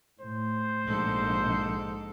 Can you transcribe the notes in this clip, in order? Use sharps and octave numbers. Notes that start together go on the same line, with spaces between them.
A2 C5
A#1 G#2 A4